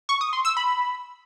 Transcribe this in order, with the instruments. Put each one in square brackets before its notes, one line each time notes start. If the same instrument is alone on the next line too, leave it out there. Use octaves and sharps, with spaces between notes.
[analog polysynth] C#6
D#6
C6
E6
B5